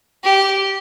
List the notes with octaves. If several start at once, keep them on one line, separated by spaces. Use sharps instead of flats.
G4